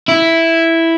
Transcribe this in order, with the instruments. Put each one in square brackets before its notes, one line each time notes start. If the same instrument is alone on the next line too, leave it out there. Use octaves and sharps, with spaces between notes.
[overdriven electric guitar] E4